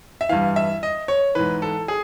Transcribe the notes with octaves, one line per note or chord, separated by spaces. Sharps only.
E5
G2 E3 F5
E5
D#5
C#5
G#2 E3 B4
A4
G#4